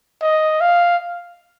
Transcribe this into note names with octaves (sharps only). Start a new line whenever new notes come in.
D#5
F5